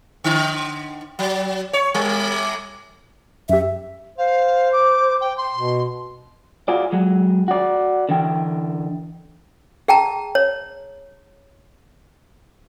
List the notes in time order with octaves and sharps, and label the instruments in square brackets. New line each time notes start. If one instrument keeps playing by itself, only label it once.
[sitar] D3
F#3
C#5
G3
[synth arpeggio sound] F#2 G4 [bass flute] E5
[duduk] C5 [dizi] F5
[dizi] D6
G5
C6
[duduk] B2
[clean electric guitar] F4 F#4 G#4 D5
F#3 G#3
F#4 D5
D3 E3 G5
[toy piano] G#4 G5 A5 A#5
C#5